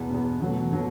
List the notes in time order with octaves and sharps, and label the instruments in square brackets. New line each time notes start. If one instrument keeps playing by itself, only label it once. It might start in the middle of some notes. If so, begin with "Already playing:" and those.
Already playing: [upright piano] E2 B2 B3
E2 B2 B3
B2 F#3 A3
B2 F#3 A3